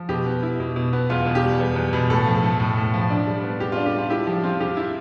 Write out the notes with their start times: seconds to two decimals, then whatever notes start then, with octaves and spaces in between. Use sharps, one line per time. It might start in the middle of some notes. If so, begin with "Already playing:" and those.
Already playing: F3
0.09 B2 G4
0.26 B3
0.43 E4
0.60 B2
0.76 B2
0.93 B3
1.10 E2 F4
1.26 B2
1.35 G4
1.43 G3
1.60 E2
1.76 E2
1.93 B2
2.10 A2 A4
2.26 F3
2.43 A3
2.60 A2
2.77 A2
2.94 F3
3.10 D4
3.27 G3
3.43 B3
3.60 C3 G4
3.72 D4 F4
3.86 G4
3.94 G3 F4
4.10 E4 G4
4.27 F3 G4
4.43 C4 F4
4.60 C3 G4
4.77 E4